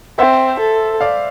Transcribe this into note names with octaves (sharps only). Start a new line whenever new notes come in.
C4 C5 E5
A4
D5 F5